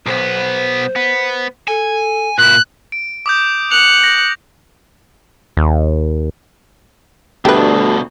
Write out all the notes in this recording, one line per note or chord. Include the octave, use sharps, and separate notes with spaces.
B1 B3 C5
B3
A4 G#5
A#2 E4 F#6
D7
D6 D#6 G6
F#6 C#7 F7
A#6
D#2
D2 G2 B2 A3 D4 G4 B4